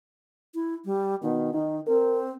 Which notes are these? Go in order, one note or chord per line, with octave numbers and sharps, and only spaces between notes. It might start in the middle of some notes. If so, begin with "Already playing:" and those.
E4
G3
B2 D#3
D#3 D#4
C4 A#4